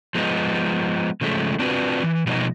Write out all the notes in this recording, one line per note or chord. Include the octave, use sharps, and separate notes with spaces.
F3 G#3 B3 D4 D#4
C#3 F3 G#3 A3
C4 D4 F4 F#4 B4
E3
B2 F3 G#3 D#4 A4 D#5